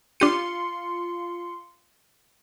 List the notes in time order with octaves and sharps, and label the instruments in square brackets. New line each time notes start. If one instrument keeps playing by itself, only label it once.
[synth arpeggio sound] D4 G4 D#7 [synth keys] F4 C6 C#7